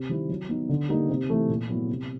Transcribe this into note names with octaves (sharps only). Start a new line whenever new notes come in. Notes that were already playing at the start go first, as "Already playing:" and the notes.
Already playing: C3
D#3 G3 C4 E4
F#3
B3 D#4
D3
G3 A#3 D#4
C3
E3 A3
A#2
F#3 B3 E4
C3